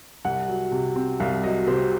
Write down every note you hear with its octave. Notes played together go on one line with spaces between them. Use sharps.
C2 F#5
F#3
C3
C4
C2 F5
F#3 D#5
C3 C5